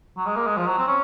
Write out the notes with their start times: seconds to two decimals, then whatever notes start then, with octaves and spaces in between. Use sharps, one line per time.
0.17 F#3
0.26 G#3
0.36 A#3
0.47 G#3
0.57 F3
0.67 F#3
0.78 C4
0.88 C#4